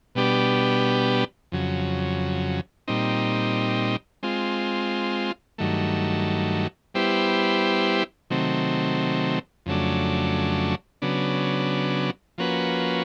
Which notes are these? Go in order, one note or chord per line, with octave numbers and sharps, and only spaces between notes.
B2 G3 B3 D4 G4
F2 C#3 F#3
A#2 G3 C4 D#4
G#3 C4 F4
G2 D#3 F#3 A3
G3 B3 E4 G4 C5
C3 D#3 F#3 A3 C4
F2 C#3 F#3 A3 D4
C#3 F#3 B3 D4
F3 A#3 C#4 F#4 B4